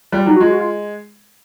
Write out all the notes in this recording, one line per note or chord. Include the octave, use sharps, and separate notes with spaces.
G3 F4
F#3 D#4
F#4
G#3 F4
F#4
F4